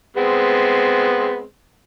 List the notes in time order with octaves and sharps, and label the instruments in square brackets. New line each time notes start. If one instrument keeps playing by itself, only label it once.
[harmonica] G#3 B3 C4